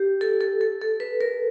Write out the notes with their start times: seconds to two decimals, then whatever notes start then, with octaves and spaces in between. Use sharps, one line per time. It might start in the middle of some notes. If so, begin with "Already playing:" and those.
Already playing: G4
0.21 A4
0.41 A4
0.61 A4
0.82 A4
1.00 B4
1.21 A#4